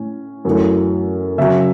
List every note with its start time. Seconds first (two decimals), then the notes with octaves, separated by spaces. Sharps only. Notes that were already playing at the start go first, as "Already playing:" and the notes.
Already playing: A2 C#4
0.45 F#2 E3 A3 C#4
1.38 C#3 F#3 C#4 E5